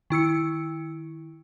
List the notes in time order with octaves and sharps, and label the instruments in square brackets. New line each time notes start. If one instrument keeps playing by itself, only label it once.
[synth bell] D#3 E4 E6 C#7